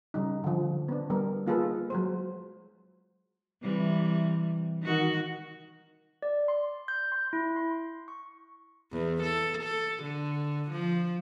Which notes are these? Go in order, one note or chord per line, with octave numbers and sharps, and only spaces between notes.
C#3 G3 D#4
D3 F3
B3 D4
G3 B3 A#4
A#3 D#4 F4 G#4 A4 B4
F#3 G#3 C5
C3 E3 G3
D#3 F#4
D5
C6
G6
C6
E4
C6
C#6
E2
A4
A4
D3
F3